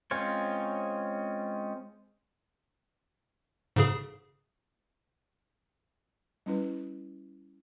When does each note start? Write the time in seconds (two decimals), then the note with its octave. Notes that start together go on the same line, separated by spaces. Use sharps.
0.11 G#3 C4 C#4 F4 C#5
3.76 G#2 C#3 G#4
6.46 G3 C#4 E4 B4